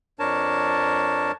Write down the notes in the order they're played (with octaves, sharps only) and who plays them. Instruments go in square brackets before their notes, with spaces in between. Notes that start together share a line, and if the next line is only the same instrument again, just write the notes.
[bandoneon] F2 D4 A#4 C#5 A5